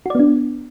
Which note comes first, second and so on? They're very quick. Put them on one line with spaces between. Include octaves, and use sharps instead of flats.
F#4 D5 B3 D4